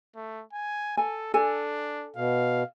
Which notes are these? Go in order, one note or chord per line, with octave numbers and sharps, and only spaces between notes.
A3
G#5
A4 G#5
D4 A4 G#5
B2 F5